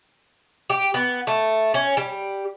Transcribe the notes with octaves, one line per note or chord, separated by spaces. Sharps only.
G4
B3
A3
C#4
G3